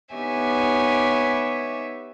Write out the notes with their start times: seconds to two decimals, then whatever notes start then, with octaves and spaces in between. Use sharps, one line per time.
0.14 B3 D#4 G4 C#5 E5 G#5